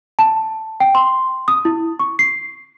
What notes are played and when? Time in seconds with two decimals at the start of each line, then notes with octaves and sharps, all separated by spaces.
0.19 A5
0.80 G5
0.95 C6
1.48 D#6
1.65 E4
2.00 C#6
2.19 C7